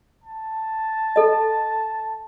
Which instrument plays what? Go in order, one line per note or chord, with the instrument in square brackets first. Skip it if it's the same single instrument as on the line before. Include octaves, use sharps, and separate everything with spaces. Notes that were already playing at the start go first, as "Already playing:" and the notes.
[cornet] A5
[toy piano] A4 D#5